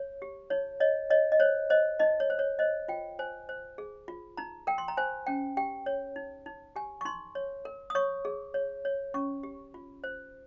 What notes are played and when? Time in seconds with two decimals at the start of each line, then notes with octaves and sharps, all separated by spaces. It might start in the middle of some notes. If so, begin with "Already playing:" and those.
Already playing: C#5
0.22 G4
0.50 D#4 C#5
0.80 C#5 D#5
1.10 C#5 D#5
1.32 D#5
1.40 C5 C#5
1.70 C5 D#5
1.99 D#4 D#5
2.20 C#5
2.30 C5
2.39 C#5
2.59 C5 D#5
2.88 F4 G5
3.19 C5 G#5
3.49 C5
3.78 G#4
4.08 F4
4.37 D#4 A#5
4.67 A#4 G5
4.78 C6
4.88 A#5
4.97 C5 G#5
5.27 C#4 G5
5.57 G4 G5
5.86 C#5
6.16 D#4
6.46 D#4
6.76 G4 G#5
7.01 C#6
7.05 D#4 C6
7.35 C#5
7.65 A#4
7.90 D#6
7.95 C#5 C#6
8.25 G#4
8.54 C#5
8.85 C#5
9.14 C#4 C#6
9.43 G4
9.74 F4
10.04 C5